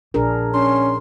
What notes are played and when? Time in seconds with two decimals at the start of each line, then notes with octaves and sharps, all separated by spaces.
0.14 A#1 D4 G#4 A#4
0.54 C#4 C6